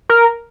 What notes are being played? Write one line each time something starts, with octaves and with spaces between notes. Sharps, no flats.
A#4